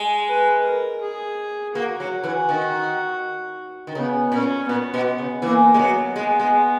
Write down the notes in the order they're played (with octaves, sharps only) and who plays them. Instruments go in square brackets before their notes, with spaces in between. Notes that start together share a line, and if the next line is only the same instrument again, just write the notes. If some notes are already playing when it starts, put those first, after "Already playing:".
Already playing: [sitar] G#3
[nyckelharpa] B4
A#4
G#4
[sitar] A#3 [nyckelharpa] F#4
[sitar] F#3
E3
D#3
D#3
[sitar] C#3 [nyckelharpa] B3
[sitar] A#2 [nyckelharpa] C#4
[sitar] A#2 [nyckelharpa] B3
[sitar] B2
C#3
[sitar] E3 [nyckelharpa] A#3
[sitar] G#3
[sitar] F#3 [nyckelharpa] B3
[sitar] G#3
G#3